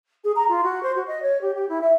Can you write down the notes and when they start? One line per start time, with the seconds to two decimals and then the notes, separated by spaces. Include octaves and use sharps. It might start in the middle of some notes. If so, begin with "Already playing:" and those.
0.24 G#4
0.35 A#5
0.48 F4
0.63 F#4
0.82 C5
0.95 F#4
1.07 D#5
1.22 C#5
1.41 G4
1.54 G4
1.69 E4
1.81 E5